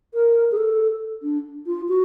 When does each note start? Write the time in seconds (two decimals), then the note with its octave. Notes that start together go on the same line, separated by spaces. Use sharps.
0.14 A#4
0.51 G#4
0.56 A4
1.22 D4
1.66 F4
1.88 F#4